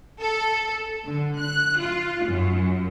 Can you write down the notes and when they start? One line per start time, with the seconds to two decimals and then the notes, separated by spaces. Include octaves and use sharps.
0.22 A4
1.05 D3
1.39 F#6
1.80 F4
2.26 F#2